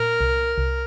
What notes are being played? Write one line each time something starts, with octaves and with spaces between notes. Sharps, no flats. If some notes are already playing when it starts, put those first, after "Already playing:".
Already playing: A#2 A#4
C2
C2